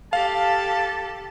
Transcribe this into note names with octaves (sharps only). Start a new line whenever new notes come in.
G4 A4 F5 A5